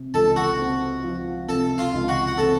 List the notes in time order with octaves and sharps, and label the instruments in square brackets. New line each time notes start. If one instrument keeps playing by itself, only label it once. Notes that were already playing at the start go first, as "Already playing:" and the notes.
Already playing: [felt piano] C3
[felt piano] C#2 [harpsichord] A4 A5
[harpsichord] F#4 F#5
[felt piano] C4
F3
[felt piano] C3 [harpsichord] A4 A5
[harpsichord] F4 F5
[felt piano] C#2
[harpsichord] F#4 F#5
F#5
[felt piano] C4 [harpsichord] A4 A5